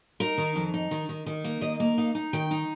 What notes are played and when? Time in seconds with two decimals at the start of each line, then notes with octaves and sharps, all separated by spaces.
0.20 D#4 A#4
0.38 D#3
0.56 F2
0.74 D#4
0.91 D#3
1.09 D#3
1.26 D#3
1.44 A#3
1.61 D#3 D#5
1.80 A#3
1.98 D#4 F5
2.15 D#4
2.33 D#3 G5
2.51 D#4